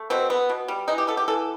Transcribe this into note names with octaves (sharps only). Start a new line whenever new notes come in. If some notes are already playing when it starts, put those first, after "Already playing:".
Already playing: A3
B2 C4
B3
B2
G3
E3 D#4
G4
B3 A4
G4
E3 A4